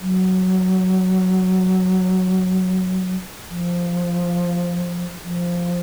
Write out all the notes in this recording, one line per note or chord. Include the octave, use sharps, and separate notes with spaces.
F#3
F3
F3